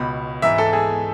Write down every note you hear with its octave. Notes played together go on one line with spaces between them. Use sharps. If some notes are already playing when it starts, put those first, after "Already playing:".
Already playing: C#2 B2 B5
G#2 E3 E5
A4
G#4